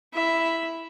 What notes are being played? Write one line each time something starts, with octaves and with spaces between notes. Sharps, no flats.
E4 E5